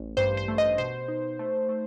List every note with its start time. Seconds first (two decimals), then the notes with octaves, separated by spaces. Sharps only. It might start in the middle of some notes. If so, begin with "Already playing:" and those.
Already playing: A1
0.17 G2 C5
0.37 C5
0.48 A3
0.58 D#5
0.78 B2 C5
1.08 D#4
1.39 A3
1.69 A3